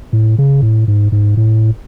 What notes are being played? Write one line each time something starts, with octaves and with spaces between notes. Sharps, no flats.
A2
C#3
A2
G#2
G#2
A2